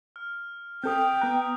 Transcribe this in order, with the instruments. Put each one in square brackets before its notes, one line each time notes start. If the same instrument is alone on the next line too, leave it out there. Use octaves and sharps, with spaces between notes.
[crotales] F6
[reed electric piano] C4 A4 [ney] G5 [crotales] D#6 G6
[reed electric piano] B3 A#5 [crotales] F#6